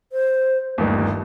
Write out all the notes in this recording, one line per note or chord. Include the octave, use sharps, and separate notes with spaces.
C5
G1 D#2 A3